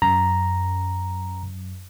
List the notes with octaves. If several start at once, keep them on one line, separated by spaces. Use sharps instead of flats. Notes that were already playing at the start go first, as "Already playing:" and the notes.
F#2 A#5